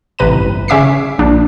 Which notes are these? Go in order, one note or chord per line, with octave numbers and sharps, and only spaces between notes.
A1 C3 B4 A#5 D#7
G1
C#3 C#4 E5 D6 B6 C7
A#1 D4